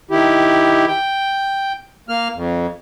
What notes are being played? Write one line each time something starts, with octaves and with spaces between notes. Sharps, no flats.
D#3 E4 G4
G5
A#3 F6
F2